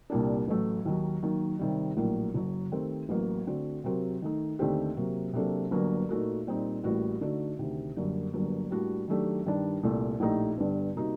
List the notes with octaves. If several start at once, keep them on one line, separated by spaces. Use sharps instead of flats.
C2 A#2 G3 A#3 D4
A1 A2 F#3 A3
D#2 D#3 F#3
D#3 F#3 A#3
C3 D#3 G3
A#1 A2 F#3 A#3 F#4
F#1 F#2 F#3
D#3 A3 C4 G4 A#4
A1 A2 F#3 A#3 F#4
D3 A3 C4 F#4
C3 F#3 C4 F#4 A#4
D#3 A3 D#4
D#2 D3 A3 C4 G4
C3 F#3 A#3 F#4
C3 F#3 A#3 D4 A4
G1 G2 F#3 A#3
A#2 A3 D#4 F#4 A#4
A#2 G3 C4 D#4
A1 A2 G3 A#3 F#4
D3 A3 D#4 F#4
D2 C3 D#3
F#2 D3 G3 A#3
G1 G2 F#3 A#3
A2 G3 A#3 D4 F#4
D#3 F#3 A3 D4 G4
G2 D#3 G3 D4
C2 A#2 A3
A#1 A2 A3 D#4 G4
G1 G2 D3
C3 G3 A#3 D#4 F#4